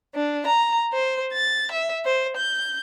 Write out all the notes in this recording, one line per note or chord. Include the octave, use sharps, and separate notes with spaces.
D4
A#5
C5
A6
E5
C5
G6